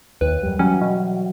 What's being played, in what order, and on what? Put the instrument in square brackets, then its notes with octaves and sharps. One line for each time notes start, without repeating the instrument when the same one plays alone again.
[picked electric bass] D#2 [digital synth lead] B4
[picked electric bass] F#2 G3
[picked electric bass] E3 F#3 G3 [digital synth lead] C#4
[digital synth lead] B2